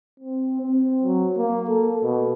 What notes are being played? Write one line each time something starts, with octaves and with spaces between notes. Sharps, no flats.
C4
C4
F#3
A#3
A4
B2